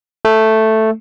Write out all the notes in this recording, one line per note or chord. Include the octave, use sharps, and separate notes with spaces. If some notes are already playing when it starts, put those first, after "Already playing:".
A3